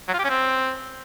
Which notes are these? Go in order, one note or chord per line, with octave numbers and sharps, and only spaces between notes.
F#3
F4
G4
C#4
C4